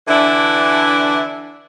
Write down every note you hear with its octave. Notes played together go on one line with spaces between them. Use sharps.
D3 E3 D4 E4